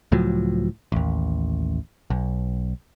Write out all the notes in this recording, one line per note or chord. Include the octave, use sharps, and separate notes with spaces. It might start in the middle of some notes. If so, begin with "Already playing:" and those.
C#2 A2 F3 F#3
A1 D#2
B1